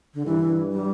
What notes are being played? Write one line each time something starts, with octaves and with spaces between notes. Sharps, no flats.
D3
G2 E3
G3